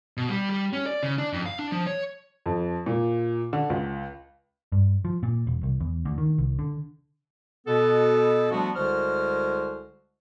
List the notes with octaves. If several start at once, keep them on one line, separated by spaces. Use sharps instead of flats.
B2
G3
G3
C#4
D5
C#3
D4
F2
F5
D4
F3
C#5
F2
A#2
D3
C#2
G2
F3
A#2
E1
C2
E2
D2
D#3
C2
D3
B2 B3 A4
F3 G3 A3 B3 D4 F#4
C2 D3 G#3 F#4 C5 F6